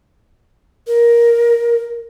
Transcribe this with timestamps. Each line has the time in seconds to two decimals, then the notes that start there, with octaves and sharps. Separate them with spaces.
0.87 A#4